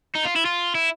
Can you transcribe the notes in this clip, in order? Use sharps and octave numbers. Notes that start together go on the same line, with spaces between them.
D#4
F4
E4
F4
E4